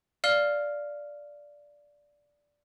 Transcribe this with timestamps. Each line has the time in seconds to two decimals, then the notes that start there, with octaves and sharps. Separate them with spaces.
0.24 D5 F5 F6 G7